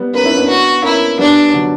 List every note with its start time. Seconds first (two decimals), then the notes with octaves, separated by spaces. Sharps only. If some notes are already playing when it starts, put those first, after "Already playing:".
Already playing: G3 B3
0.14 A#3 C#4 B4
0.25 C#4 E4
0.37 B3 D4
0.48 F#4
0.83 A#3 C#4 E4
1.19 G3 B3 D4
1.54 D3 F#3